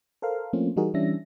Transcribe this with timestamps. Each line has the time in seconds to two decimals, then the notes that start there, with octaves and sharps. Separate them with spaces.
0.22 A4 A#4 C5 F5
0.53 F3 A3 A#3 C4 C#4 F4
0.76 E3 G3 D#4 F#4 G#4 A#4
0.94 E3 G3 C#4 D4 E5 A#6